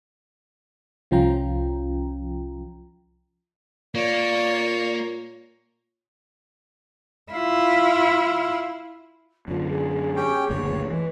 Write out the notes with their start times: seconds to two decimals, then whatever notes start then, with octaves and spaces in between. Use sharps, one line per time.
1.11 C2 F3 C#4 F4 G5 A#5
3.95 A#2 A#3 C#5 D5
7.32 E4 F4
9.48 F#2 D3 F4
9.70 G#4
10.16 C#4 G4 G5
10.50 F#1 D2 A#2 C#5
10.91 E3 G#3